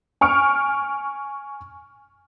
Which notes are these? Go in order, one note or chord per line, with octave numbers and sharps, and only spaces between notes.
G#5 C#6 F6 D7